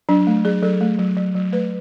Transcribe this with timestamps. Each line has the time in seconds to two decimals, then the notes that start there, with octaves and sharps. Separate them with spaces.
0.09 F#3 D4
0.27 A3
0.45 F#3 G#4
0.62 F#3 A4
0.81 A3
0.99 F#3
1.17 F#3
1.35 F#3
1.52 A3 B4